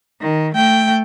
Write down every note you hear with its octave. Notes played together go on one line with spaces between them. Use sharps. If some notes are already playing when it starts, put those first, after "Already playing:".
D#3
A3 G5